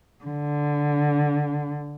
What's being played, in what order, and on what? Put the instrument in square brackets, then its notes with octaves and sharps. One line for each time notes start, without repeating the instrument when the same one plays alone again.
[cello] D3